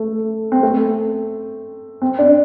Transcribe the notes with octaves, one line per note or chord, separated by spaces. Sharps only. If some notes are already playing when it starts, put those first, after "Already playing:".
Already playing: A3
C4
A3
C4
D4